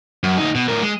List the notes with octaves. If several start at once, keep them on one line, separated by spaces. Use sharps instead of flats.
F#2
D2 D#4
B2
A2 A#4
G#3